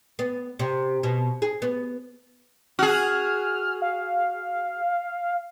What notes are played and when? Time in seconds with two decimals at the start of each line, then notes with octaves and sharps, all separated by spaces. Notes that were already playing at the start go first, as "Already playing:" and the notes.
0.19 B3
0.59 C3
1.03 B2
1.42 G#4
1.62 B3
2.79 F#4 G#4 F6
3.82 F5